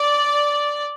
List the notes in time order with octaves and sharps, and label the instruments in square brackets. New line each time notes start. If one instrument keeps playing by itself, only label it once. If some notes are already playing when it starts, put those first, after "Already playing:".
Already playing: [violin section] D5